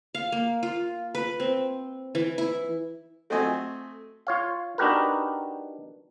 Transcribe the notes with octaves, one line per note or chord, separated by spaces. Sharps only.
F5
A#3
F4
B4
C4
E3
E4
A3 C4 F#4 D#5 G#5
F4 C#5 F5
D4 D#4 F#4 G4 A#4 B4